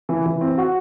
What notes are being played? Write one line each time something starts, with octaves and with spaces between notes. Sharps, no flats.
E3
E3
C4
F#4